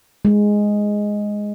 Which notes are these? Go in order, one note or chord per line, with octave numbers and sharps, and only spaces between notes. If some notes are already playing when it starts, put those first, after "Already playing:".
G#3